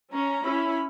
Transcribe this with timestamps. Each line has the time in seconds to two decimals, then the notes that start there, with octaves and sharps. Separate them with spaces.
0.13 C#4 A#5
0.43 C#4 E4 B5